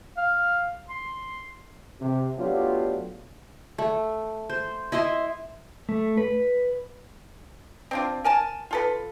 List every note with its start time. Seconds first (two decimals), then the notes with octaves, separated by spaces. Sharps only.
0.17 F5
0.89 C6
2.01 C3
2.37 F#3 A3 B3 D4 F4 G4
3.78 A3
4.49 C5
4.92 E4 D#5 E5 C6
5.89 A3
6.17 B4
7.91 C4 D4 F4
8.24 A#4 G#5 A5
8.71 F4 A4 B4